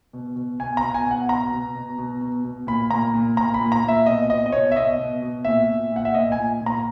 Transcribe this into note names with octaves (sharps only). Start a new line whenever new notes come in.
B2
B2
B2 G#5
A#5
B2
G#5
B2
F#5
B2 A#5
B2
B2
B2
B2
B2
A#2 B5
A#2 A#5
A#2
A#2 A#5
B5
A#2
A#5
A#2 E5
B2 D#5
B2 D#5
D#5
B2 C#5
E5
B2 D#5
B2
B2
A#2 E5
A#2
A#2 F#5
E5
A#2 D#5
G#5
A#2
A#2
A#5